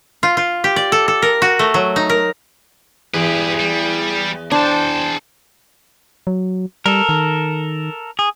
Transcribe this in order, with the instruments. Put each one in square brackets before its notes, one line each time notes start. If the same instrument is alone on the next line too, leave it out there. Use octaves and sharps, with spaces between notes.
[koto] F4
F4
G4
D5
A4
A4
A#4
F#4
A3
F#3
D#4
A#4
[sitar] E2 [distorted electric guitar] G4 B4 [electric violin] G#4
[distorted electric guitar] G3
[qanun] D4 [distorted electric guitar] G#4 A5 [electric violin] C5 G5
[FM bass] F#3
[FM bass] G3 [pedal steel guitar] A4 A#4
[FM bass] D#3
[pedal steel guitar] G#4